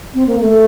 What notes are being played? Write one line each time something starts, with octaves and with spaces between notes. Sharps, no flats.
C4
A#3
A3